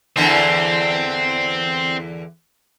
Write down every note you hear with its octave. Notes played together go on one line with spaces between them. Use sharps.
E2 D3 E3 C4